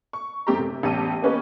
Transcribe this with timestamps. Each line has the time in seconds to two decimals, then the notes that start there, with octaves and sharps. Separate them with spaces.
0.13 C#6
0.47 F#2 C4 G4 A4 A#5
0.59 C3
0.83 A1 E2 G4 A5 D#7
1.22 A#3 B3 C#4 G4 B4 D#5